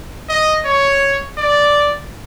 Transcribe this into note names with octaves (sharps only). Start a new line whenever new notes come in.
D#5
C#5
D5